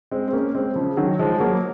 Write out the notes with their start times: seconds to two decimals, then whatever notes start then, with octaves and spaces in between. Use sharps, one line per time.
0.11 G#3 C4
0.28 C4
0.32 A#3 C#4
0.55 G#3 C4
0.75 C#3 F3
0.97 D#3 F#3
1.19 F3 G#3
1.40 F#3 A#3